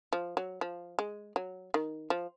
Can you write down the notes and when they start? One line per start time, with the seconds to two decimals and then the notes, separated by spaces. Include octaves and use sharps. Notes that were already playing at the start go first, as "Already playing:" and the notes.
0.13 F3
0.37 F#3
0.61 F3
0.99 G#3
1.36 F#3
1.74 D#3
2.10 F3